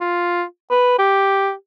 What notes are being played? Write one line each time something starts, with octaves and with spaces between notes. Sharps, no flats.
F4
B4
G4